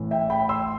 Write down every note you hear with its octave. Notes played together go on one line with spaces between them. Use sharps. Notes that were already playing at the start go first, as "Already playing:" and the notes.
Already playing: A1 A2 E3 A3
E5 G5
G5 B5
C6 E6